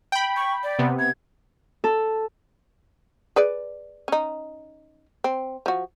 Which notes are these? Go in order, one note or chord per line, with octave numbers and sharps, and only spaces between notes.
G5 B5
C#6
D5
C3 B3
G#6
A4
G#4 B4 D5
C#4 D#4
C4
F3 F#4